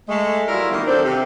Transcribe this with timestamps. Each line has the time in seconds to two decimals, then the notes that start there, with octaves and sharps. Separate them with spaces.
0.09 G#3 A3
0.48 F#3 G3 E4 F4 A#4
0.71 D#3 E3 G3 A#3 B3
0.87 D#3 C4 D4 A4 C5
1.04 C3